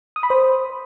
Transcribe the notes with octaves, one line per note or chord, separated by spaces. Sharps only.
D#6
B5
C5